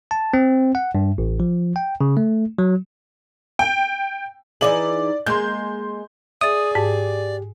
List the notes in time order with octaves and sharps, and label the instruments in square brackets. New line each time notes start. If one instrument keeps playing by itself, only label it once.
[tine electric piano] A5
C4
F#5
G2
A1
F3
G5
C#3
A3
F#3
[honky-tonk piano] G5
[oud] E3 D#4 G#4 [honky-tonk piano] D5 F#7
[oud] G#3 A#3 [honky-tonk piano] C6 G6
[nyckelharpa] G#4 [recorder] D5 [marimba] E5 A6 [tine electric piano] D#6
[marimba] G#2 [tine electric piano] G4